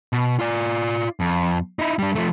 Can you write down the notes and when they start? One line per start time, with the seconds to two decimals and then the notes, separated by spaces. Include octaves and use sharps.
0.13 B2
0.40 F4 D5
1.20 F2
1.79 D#4 E4
1.99 G3 D4
2.15 F3 A3